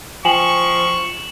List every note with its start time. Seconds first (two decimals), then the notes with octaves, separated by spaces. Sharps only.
0.25 F3 G5 G#5 C#6 E7 F#7